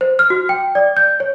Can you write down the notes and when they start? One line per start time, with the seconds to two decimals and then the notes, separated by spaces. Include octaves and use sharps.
0.01 C5
0.19 F6
0.30 F#4
0.49 G5
0.75 D5
0.97 G6
1.20 C#5